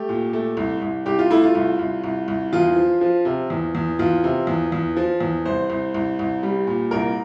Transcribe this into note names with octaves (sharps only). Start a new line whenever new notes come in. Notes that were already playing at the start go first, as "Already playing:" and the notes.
Already playing: A3 G4
A#2
A3
C2
C2
C2 G4
F4
A3 E4
F4
C2
C2
C2
C2
E2 F4
F3
F3
C3
E2
E2
E2 F4
C3
E2
E2
F3
E2
C2 C5
C2
C2
C2
G3
A#2
C2 A#4